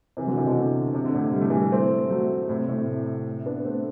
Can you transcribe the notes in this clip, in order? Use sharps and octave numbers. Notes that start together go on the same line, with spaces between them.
C3 E3
D3 F#3
C3 E3
B2 D3
C3
D3
A2 C3
G3
A3
E3 G3
A3 C4
F#3 A3
A2 C3
A2 C3
B3 D4
A3 C4